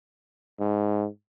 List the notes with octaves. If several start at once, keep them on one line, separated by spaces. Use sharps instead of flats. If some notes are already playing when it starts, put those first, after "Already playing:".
G#2